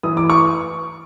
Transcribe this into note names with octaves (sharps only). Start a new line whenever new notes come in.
E3 D#6
D6
C#6